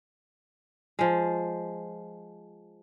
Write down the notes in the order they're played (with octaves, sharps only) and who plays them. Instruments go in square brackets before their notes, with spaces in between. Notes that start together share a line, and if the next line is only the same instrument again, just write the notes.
[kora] F3 G#3